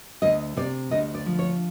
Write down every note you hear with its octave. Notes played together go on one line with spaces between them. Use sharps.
D2 D#5
C3 D5
D2 D#5
D5
F3
C#5